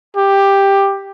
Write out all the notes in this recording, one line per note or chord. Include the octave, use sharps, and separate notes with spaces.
G4